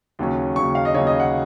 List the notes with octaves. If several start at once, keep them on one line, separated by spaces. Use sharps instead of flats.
D#2 C#3 F#3 C#4
D#2 C#3 F#3 C#4 C#6
F5
D#5
D#2 C#3 F#3 C#4 C#5
D#5
F#5